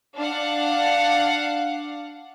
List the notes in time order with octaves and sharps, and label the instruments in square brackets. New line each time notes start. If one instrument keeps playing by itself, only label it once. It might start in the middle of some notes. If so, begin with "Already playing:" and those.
[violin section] D4 F5 F#5